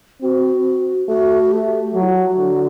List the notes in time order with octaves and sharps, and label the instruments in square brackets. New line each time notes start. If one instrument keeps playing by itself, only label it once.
[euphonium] C4 [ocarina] F#4
[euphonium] A3 [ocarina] F#4
[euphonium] A3 [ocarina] G4
[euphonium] F#3 [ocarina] F#4
[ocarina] E4
F#4
[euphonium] D3